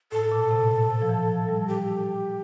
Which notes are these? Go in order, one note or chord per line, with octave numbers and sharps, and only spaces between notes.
A2 A4
A#2
C3
A2
A#2
C3
F3
E3
F3
G3
G4